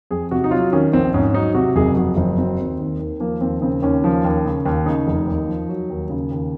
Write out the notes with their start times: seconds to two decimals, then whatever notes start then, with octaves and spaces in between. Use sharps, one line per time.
0.11 F2 G#4
0.31 C3 F#4
0.44 D#4
0.51 F#3 F4
0.72 D#3 C#4
0.93 A#1 C4
1.14 G#2 C#4
1.29 C#4
1.34 F#3 D#4
1.55 C3 F#4
1.76 F#1 G#4
1.96 F2 F#4
2.17 F#1 C4
2.38 F#3 C4
2.59 D#2
2.79 D#3
3.00 D#2
3.20 F3 A#3
3.41 D#2 C4
3.61 C#3 C4
3.82 D#2 C#4
4.04 F3
4.25 D#2
4.45 C#3
4.66 D#2
4.86 C#3 D#4
5.07 F1
5.28 D#2
5.48 F3
5.68 F#3
5.90 D#2
6.10 C#3
6.32 D#2